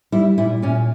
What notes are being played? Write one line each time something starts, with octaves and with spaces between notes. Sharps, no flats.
G3 E4
A#2 E4
A#2 C#4